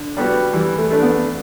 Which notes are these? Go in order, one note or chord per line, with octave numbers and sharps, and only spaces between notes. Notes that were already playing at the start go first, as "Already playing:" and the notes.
Already playing: D3
G3 B3 F#4
E3 G3
A3
A3 D4
B3